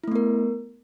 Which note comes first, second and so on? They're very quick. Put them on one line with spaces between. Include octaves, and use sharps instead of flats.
E4 A3 B3 A#4